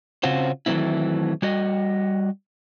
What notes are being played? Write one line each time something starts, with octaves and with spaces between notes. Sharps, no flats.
C#3 C4 C#4 F4 F#4 C5
D#3 E3 F#3 A3 C4 E4
G3 F#4 D#5